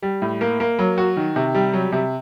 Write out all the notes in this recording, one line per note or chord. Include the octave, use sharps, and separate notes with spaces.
G3
A2
A#3
A#3
F#3
F#4
D#3
C3
G3
F#3
C3